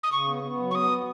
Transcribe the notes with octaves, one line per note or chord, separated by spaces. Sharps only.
D#6
C#3 C#6
B3
B3
F#3
C#6
B3 D#6
F#3